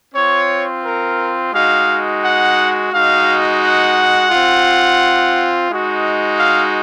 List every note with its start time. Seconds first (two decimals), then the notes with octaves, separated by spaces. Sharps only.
0.15 C4 F4 C#5
0.84 A#4
1.53 G#3 D#4 F#4 F5
2.23 F#5
2.92 G#3 D#4 F#4 F5
3.62 F#5
4.31 C4 F4
5.70 G#3 D#4 F#4
6.39 F5